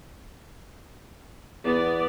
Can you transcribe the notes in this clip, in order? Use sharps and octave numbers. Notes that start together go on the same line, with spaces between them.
E2 B3 D5